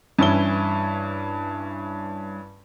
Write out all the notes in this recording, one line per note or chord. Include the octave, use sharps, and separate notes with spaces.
G2 E3 C#4 E4 G7